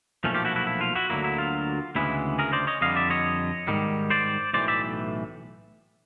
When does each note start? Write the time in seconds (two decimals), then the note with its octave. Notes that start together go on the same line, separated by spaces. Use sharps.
0.24 B1 A#2 F3 A3 C#4
0.34 F4 G4
0.45 E4 F#4
0.56 E4 F#4
0.67 E4
0.81 F4
0.95 E4 F#4
1.10 D2 D3 F#3 A#3 E4
1.24 E4
1.38 F4
1.95 D2 C#3 E3 G#3 B3 E4
2.39 G#4 A#4
2.53 C5 D5
2.67 C#5 D#5
2.81 F2 D3 G3 D#5 F5
2.96 D5 E5
3.10 C#5 D#5
3.68 G#2 D#3 G3
4.10 C5 D5
4.53 B1 A2 E3 C5 D5
4.68 D5 E5